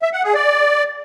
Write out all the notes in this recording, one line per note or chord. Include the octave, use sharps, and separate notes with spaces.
E5
F#5
G#4
D5